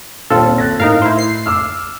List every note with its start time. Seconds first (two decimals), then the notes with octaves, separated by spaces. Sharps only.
0.30 D#1 C4 F4 A4 C5
0.58 F#6 A6 A#6
0.80 A2 D#4 A#4 F5
1.02 E4 C5
1.19 C7
1.46 D6 E6 F6